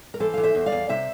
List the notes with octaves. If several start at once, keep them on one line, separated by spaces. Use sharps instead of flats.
A#4
E3 A4 C5
E3 F5
C5 E5
E2
D5 F5
E2
C3 C5 E5